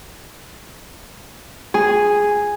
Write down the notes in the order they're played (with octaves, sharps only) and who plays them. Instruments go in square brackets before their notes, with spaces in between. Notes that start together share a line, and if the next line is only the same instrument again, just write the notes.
[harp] G#4